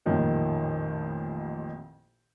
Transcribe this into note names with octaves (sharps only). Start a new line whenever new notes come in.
A1 F2 A#2 D#3 F3 G3